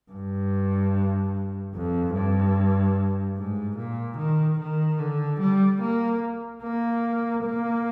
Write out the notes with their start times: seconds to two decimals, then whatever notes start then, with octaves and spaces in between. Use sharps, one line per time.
0.12 G2
1.74 F2
2.15 G2
3.37 G#2
3.77 A#2
4.18 D#3
4.59 D#3
4.99 D3
5.40 G3
5.81 A#3
6.63 A#3
7.44 A#3